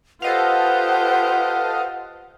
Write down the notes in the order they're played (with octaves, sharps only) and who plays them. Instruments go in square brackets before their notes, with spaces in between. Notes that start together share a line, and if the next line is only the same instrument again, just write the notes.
[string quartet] F4 G4 C5 [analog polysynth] A4 D#5 F5 [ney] B4 [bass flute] F#5